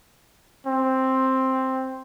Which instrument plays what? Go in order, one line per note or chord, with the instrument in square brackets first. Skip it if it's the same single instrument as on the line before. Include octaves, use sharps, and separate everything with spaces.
[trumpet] C4